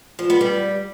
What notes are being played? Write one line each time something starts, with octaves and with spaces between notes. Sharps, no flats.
F3
B3
G3